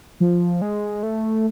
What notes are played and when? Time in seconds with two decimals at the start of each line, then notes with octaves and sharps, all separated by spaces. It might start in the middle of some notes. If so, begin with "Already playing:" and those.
0.20 F3
0.62 G#3
1.03 A3